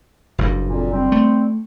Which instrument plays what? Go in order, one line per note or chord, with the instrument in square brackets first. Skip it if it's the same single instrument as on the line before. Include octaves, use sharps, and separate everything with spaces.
[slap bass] F#1 G2
[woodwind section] F2 A#2
G3 C4
[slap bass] A3